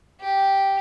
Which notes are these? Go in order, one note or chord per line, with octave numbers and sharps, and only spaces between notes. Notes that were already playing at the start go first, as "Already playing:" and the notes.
G4